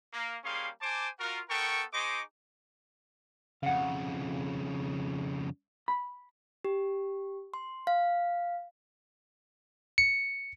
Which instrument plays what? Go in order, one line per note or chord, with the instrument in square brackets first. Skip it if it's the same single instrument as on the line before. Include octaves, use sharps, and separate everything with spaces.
[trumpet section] A#3
G3 A#3 C#4 G#4 F5 C6
C5 G#5 A5 D6
F4 F#4 A#4
B3 A4 A#4 G5 C#6
D#4 G#4 C5 D#5 C#6 D6
[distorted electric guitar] F2 C#3 [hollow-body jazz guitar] F5 F#5
[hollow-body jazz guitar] B5
[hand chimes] G4
C6
F5
[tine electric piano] C#7